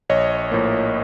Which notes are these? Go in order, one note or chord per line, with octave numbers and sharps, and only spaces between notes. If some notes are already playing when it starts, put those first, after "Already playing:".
A#1 C#5 D#5
A2 F3 A#3